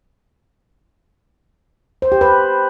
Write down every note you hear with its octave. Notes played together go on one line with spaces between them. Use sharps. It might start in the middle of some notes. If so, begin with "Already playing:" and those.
C5
G4
B4